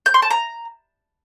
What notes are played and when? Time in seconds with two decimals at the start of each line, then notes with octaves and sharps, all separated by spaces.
0.06 G6
0.14 C6
0.22 A5
0.30 A#5